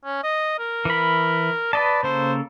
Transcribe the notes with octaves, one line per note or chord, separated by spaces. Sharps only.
C#4
D#5
A#4
E3 B5
B4 D5 D#5 A5
C#3 A#3 A4 C5